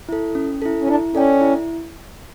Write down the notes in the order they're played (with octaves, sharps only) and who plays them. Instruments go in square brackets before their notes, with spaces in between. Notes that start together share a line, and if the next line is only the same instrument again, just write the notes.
[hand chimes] E4 A4
C#4
E4 A4
[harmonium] C#4
[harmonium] D4 [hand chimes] E4
[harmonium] C#4 [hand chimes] A4 D5 G5
[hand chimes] E4